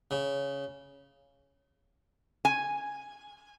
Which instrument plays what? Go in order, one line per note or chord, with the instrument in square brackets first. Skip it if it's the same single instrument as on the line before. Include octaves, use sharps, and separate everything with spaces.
[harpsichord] C#3
[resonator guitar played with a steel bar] G#5